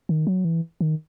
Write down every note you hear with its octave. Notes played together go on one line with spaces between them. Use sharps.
D#3
F#3
E3
D#3